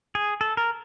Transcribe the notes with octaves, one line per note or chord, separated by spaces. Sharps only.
G#4
A4
A#4